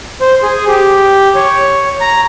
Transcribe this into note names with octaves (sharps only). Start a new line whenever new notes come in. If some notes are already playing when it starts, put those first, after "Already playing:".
C5
G#4
G4
C#5
A#5